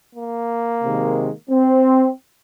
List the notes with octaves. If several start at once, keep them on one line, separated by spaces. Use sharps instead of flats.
A#3
C3 D#3 G#3
C4